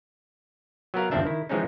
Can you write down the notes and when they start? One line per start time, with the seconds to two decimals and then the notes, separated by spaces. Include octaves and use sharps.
0.94 F#3 B3 A#4 F5
1.11 G1 E2 F3 C4 D4 E5
1.25 D#3 E4
1.49 E3 F3 G#3 C4 C#4 D#4